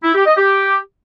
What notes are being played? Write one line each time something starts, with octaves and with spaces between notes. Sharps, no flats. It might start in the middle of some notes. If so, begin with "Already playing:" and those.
E4
G4
D#5
G4